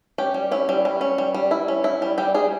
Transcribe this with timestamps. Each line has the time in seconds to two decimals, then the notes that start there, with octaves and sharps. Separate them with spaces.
0.18 C#4 G4
0.34 G3
0.52 C#4 E4
0.69 G3
0.85 G3
1.01 C#4
1.18 G3
1.34 G3
1.51 E4
1.68 C#4
1.84 E4
2.02 G3
2.18 G3 G4
2.34 G3 G#4